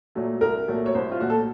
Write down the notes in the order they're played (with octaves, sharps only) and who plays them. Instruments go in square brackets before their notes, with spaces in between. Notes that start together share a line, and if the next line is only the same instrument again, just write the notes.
[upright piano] A#2 F#3 A3
C2 A#4
A#2 F#3 A3
C#5
C2 C5
F4
A#2 F#3 A3 F#4
A4